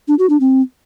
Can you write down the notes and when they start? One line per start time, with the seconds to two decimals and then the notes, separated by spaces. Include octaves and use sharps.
0.08 D4
0.19 F#4
0.30 D4
0.40 C4